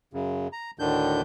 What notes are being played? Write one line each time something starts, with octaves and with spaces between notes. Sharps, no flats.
F#2 C#3
A#5
D2 A2 D3 D#3 D4 G6